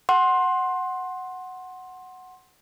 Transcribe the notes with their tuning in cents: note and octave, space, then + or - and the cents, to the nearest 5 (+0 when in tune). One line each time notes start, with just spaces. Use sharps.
F#5 +0 C6 +15